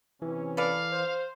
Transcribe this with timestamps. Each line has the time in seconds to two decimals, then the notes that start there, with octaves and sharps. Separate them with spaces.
0.22 C3 E3 C#4
0.57 A4 B4 D5 F5
0.92 C5